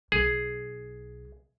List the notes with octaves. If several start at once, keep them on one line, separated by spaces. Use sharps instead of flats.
B1 G#4